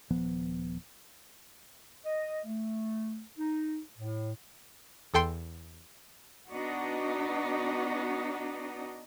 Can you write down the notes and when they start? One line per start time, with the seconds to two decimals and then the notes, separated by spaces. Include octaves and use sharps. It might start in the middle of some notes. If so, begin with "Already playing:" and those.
0.10 D#1 F3 B3
2.05 D#5
2.45 A3
3.38 D#4
3.98 A2
5.14 E2 A4 G5 C6
6.50 B3 D4 D#4 F#4 D#5